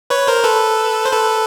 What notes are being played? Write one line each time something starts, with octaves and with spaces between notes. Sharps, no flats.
B4 C#5
A#4 C5
A4 B4
C5
A4 B4